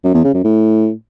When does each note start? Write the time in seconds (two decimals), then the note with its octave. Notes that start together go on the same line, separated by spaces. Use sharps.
0.04 F#2
0.14 E2
0.24 C#3
0.34 F#2
0.44 A2